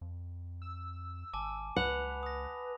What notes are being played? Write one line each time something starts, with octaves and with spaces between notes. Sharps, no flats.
F2
E6
G#1 G#5 A5 D6
C#2 B4 F#5 B5 F7
D#6 A#6